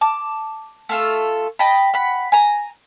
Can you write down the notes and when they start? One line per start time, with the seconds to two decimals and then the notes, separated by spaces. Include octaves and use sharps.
0.01 A5 D6
0.89 A3 F4 A4
1.59 D#5 G5 A5 B5
1.94 F#5 B5
2.32 G#5 A#5